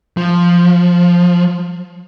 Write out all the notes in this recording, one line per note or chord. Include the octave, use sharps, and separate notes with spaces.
F3